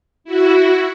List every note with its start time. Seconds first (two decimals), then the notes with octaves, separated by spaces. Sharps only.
0.24 E4 F#4